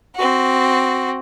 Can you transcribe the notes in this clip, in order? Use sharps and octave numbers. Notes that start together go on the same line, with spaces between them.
C4 F#4